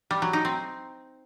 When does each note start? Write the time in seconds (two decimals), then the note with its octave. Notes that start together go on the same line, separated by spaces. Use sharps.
0.11 G3
0.22 F#3
0.33 D#4
0.45 C4